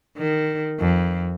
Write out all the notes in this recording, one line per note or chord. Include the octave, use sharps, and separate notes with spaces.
D#3
F2